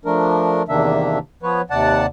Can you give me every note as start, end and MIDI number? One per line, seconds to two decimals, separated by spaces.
0.05 0.62 53
0.05 0.62 57
0.05 0.62 62
0.05 0.62 70
0.68 1.18 40
0.68 1.18 48
0.68 1.18 51
0.68 1.18 58
0.68 1.18 62
0.68 1.18 76
1.42 1.61 53
1.42 1.61 59
1.42 1.61 71
1.42 1.61 73
1.70 2.06 39
1.70 2.06 48
1.70 2.06 74
1.70 2.06 78
1.70 2.06 81